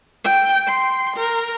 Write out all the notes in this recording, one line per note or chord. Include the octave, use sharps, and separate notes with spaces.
G5
C6
A#4